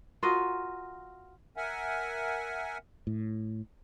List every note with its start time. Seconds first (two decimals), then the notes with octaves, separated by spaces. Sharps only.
0.23 F4 F#4 A#4 D#5
1.57 A#4 E5 F#5 G#5
3.07 A2